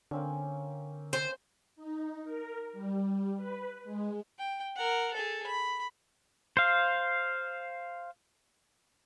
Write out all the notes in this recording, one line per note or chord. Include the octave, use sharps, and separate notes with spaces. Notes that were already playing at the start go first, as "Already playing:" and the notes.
D3 A#3 C4 C#4
C5
D#4
A#4
G3
B4
G#3
G5
A#4 F#5
G#4 A4
B5
C5 F5